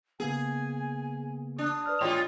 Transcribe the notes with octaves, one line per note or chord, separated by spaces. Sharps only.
C#3 A#3 B3 G#4 G#5
D4 D#6
B4 D5 F6
A2 G#3 F4 C#5 G5 C6